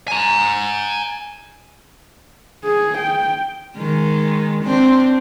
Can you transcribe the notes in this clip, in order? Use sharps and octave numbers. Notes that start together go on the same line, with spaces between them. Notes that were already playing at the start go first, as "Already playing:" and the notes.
G#5 A#5
G#4
G5
D#3 G#3
C4 D4